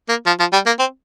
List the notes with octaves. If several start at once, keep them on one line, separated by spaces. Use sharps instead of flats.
A#3
F3
F3
G3
A#3
C4